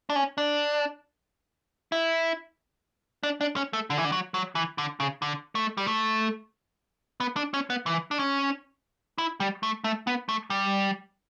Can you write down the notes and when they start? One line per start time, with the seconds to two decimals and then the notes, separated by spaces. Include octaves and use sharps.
0.10 D4
0.16 C#4
0.38 D4
1.92 E4
3.23 D4
3.41 D4
3.56 C#4
3.73 A3
3.90 D3
3.98 E3
4.05 D3
4.12 F#3
4.34 F#3
4.55 E3
4.78 D3
5.00 C#3
5.22 D3
5.55 A3
5.77 G3
5.87 A3
7.20 B3
7.36 D4
7.54 C#4
7.70 B3
7.86 E3
8.11 D4
8.19 C#4
9.18 E4
9.40 G3
9.63 A3
9.84 A3
10.07 B3
10.29 A3
10.50 G3